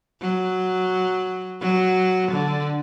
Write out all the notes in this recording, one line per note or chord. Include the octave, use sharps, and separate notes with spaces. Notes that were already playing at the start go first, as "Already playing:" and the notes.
F#3
F#3
D3